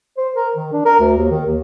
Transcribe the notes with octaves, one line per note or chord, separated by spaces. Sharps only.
C5
A#4
D#3
D4
A#4
D2
D#2
D#3
D#2